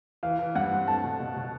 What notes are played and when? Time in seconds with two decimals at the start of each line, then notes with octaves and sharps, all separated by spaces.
0.23 E3 F5
0.39 E3
0.56 G2 F#5
0.72 C4
0.88 A3 A5
1.04 B2
1.20 B2
1.37 B2